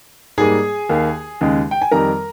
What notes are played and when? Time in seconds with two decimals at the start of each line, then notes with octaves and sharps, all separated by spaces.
0.38 G#2 G3 A#3 G#4 G#5
0.89 D#2 D#3 A#3
1.41 D#2 C#3 G#3
1.71 G5
1.82 G#5
1.91 F2 D#3 G3 A#4 A#5